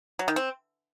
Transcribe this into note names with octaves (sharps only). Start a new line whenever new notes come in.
F#3
D#3
C4